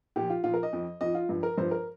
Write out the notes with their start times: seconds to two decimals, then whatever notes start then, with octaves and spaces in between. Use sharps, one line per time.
0.16 A#2 F3 G4
0.30 F4
0.44 A#2 F3 F4
0.54 A#4
0.63 D#5
0.73 F2 F3
1.01 F2 F3 D#5
1.15 F4
1.29 G2 F3
1.43 A#4
1.58 G2 F3 C5
1.71 A#4